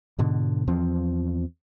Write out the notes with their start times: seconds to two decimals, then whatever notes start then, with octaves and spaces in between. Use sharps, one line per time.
0.19 G#2 B2 D3
0.67 E2 F3 C4